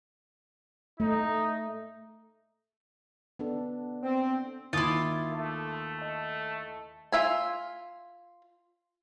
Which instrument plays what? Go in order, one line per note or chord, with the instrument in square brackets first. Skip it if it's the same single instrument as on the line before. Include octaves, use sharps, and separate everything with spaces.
[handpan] A3 [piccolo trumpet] D#4
[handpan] B3 D4 A4
[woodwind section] C4
[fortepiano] D#2 [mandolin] E4 F4 [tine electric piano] D6 D#6 A6
[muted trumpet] A3
[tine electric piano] D#5 A5
[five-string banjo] F4 E5 G#5